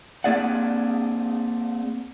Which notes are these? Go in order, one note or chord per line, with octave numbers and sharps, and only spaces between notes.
A#3 C4 G#4 D5 F#5